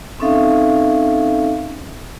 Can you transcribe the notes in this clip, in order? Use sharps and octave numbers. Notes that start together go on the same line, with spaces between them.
C4 C#4 D#4 A4 E5 F5